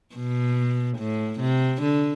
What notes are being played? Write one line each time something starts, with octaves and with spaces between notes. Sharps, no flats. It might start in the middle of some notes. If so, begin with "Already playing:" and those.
B2
A2
C3
D3